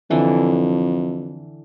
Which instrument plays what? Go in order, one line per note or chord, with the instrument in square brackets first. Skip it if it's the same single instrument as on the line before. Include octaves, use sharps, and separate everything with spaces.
[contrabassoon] F2 [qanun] D3 E3